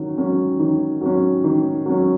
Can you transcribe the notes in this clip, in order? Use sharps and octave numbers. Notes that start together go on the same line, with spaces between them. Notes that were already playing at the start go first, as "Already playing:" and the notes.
Already playing: D#3 F#3 C#4
F#3 C#4
D#3
F#3 C#4
D#3
F#3 C#4